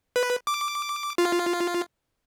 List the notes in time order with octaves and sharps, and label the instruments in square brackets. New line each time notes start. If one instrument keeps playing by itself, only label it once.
[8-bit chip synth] B4
D6
F4